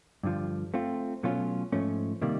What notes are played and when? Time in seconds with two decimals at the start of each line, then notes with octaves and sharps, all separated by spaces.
0.23 G2 D3 F3
0.74 A3 C4 F4
1.23 B2 F#3 A3 C#4 F4
1.72 G#2 F3 A3 C#4
2.22 C3 D#3 G3 A#3